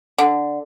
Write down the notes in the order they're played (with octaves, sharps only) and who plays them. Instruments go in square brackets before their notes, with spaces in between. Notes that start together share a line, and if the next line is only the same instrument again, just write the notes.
[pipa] D3